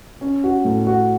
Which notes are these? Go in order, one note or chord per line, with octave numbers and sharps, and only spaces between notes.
C#4
F#4
A2
F#4